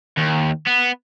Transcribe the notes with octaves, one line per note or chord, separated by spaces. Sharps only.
D#2
B3